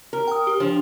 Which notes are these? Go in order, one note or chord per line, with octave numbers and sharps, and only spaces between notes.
A#4
G5 D#6
G4
F3 D4